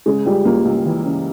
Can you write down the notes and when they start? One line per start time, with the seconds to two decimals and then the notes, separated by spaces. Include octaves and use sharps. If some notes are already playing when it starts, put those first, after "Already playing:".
0.06 C#3 G#3
0.26 C#2 G3
0.45 C#2 A#3
0.65 C#2
0.85 E3
1.05 C#3